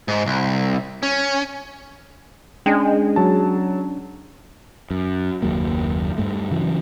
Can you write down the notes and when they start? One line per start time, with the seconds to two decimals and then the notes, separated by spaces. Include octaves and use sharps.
0.08 G#2
0.26 C2
1.03 C#4
2.66 G#3 C#4 D4 G5
3.16 F#3 A5
4.91 F#2
5.42 F#1 D#2 F#3 A#3
6.18 G2 A3
6.51 C#3 E3 F#3